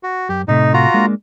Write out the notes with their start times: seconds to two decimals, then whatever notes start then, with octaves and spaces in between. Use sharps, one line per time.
0.03 F#4
0.29 F#2 G4
0.48 A2 C3 A3 D#4
0.74 F4 F#4 A#5
0.94 G#3 A#3 D4